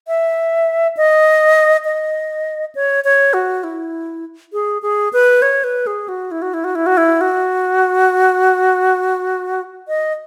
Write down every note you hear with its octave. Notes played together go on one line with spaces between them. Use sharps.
E5
D#5
D#5
C#5
C#5
F#4
E4
G#4
G#4
B4
C#5
B4
G#4
F#4
E4
F#4
E4
F#4
E4
F#4
E4
F#4
D#5